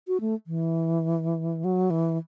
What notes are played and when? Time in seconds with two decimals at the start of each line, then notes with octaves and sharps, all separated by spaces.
0.08 F#4
0.21 A3
0.47 E3
1.64 F#3
1.90 E3